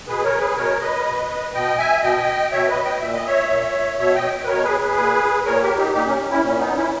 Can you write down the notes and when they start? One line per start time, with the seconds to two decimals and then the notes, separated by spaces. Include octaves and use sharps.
0.08 B2 G#4 B4
0.24 A#4 C#5
0.40 G#4 B4
0.56 B2 A#4 C#5
0.81 B4 D#5
1.06 B2
1.54 B2 D#5 G5
1.78 E5 G#5
2.03 B2 D#5 G5
2.52 B2 C#5 E5
2.68 B4 D#5
2.84 D#5 G5
3.00 A#2 E5
3.14 D#5
3.26 C#5 E5
3.50 A#2
3.99 B2 C#5 E5
4.15 D#5 G5
4.44 B4
4.47 B2 A#4 C#5
4.63 G#4 B4
4.80 G#4 B4
4.97 A#2
5.45 A#2 A#4 C#5
5.62 G4 A#4
5.77 D#4 G4
5.94 A#2 D#4 G4
6.07 C#4
6.19 C#4
6.30 C#4 E4
6.43 A#2 C#4
6.59 B3 D#4
6.75 C#4 E4